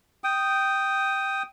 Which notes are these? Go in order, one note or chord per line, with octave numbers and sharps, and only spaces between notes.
G5 D#6